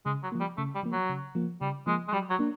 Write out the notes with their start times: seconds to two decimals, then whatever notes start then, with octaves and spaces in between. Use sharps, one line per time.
0.06 C#3 G#3
0.23 F#3
0.32 F3 A#3
0.40 G3
0.57 C#3 A3
0.75 G3
0.83 F3 A#3
0.92 F#3
1.10 C#3
1.35 F3 A#3
1.61 C#3 G3
1.87 F3 G#3 A#3
2.08 G#3
2.13 F#3 G3
2.30 F#3
2.39 A#3 D4